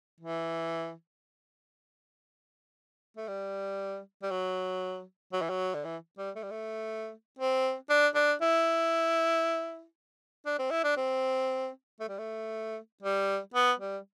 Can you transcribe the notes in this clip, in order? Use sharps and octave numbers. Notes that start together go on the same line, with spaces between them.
E3
A3
G3
G3
F#3
F#3
E3
F#3
D3
E3
G3
A3
G3
A3
C4
D4
D4
E4
D4
C4
E4
D4
C4
A3
G3
A3
G3
B3
G3